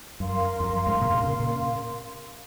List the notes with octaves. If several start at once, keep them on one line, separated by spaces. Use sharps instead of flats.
F#2 A#4 F5 C6
F2
F#2
F2 G#2
A#2 C#3
A#2 C#3
C3
A#2 C#3
A#2 C#3